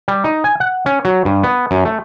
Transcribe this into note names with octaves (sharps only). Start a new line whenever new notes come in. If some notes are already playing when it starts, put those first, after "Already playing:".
G3
D#4
G#5
F#5
C#4
F#3
G2
B3
F#2
A3